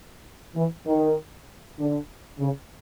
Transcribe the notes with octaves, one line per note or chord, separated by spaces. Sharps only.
E3
D#3
D3
C#3